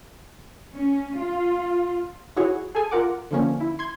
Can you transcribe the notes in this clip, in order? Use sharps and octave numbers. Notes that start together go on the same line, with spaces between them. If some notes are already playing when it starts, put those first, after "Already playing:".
C#4
F4
E4 F#4 G#4 C#5
G#4 A4 G#5
F4 A#4 F#5 D6
D3 F3 A#3 C#4
E4
C6 G#6